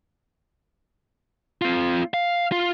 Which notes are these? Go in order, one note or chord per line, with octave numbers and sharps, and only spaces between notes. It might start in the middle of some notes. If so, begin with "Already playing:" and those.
C4 F4
F5
F4